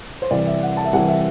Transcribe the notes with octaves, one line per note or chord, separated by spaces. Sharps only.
C5
C2 C3 E3 D5
E5
F#5
A5
E5
C2 C3 E3 F#5
E5